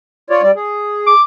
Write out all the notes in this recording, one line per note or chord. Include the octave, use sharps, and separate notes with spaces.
F4 C#5 D5
G3 D5
G#4
D6